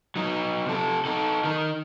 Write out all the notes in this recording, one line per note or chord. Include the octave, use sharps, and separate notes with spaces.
F#3 D#4
C3 A4
D#4 A4
D#3 D#4